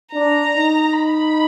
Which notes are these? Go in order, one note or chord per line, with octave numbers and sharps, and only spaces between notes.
D4 A#5
D#4
B5